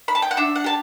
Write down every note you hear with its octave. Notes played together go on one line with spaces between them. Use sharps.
B5
A5
G5
F#5
D4 E5
F#5
G4 A5